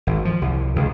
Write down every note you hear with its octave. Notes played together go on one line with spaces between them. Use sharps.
G#1
F3
C2
C#2